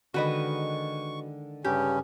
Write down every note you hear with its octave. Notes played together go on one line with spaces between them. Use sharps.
D3 D#3 G#3 F#4 B4 D#5 C#6
G2 C#3 C#4 G4